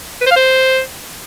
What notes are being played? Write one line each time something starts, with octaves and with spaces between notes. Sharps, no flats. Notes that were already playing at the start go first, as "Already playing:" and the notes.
B4
C5
F5
C5